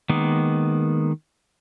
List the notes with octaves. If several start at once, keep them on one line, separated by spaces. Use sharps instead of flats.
D#3 G#3 A#3 B3